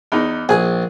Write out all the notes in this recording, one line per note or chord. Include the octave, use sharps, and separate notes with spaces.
E2 D#4
A#1 G#4 G#5